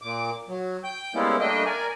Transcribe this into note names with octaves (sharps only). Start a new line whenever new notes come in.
A#2 D6
F#3
G5 G6
G3 G#3 A#3 B3 C#4 E4
G3 A3 A#3 D4 D#5 G5
A#4 D5 G#5